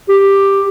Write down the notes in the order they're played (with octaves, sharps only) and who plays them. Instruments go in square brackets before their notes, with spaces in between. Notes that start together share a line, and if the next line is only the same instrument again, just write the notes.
[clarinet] G4